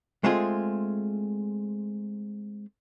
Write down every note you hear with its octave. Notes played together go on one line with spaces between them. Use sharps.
G#3 A3 C4 F4 G#4